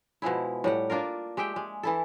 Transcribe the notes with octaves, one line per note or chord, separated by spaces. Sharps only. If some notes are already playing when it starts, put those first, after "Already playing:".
B2 F3 G#3 E4
A2 G3 F#5
A#3 D4 F4 A#4
G#3 G4 E5 G5
G#3
E3 E4 A4